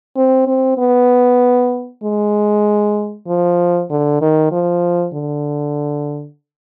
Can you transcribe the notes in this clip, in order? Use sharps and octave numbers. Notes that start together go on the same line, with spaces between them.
C4
C4
B3
G#3
F3
D3
D#3
F3
D3